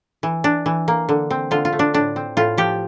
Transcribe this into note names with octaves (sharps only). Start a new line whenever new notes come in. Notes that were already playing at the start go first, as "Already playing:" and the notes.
E3
D4
E3
A#3
D3
C4
D3 F4
F4
A3
D4
A2 D4
C4
A2 F4
F3 G4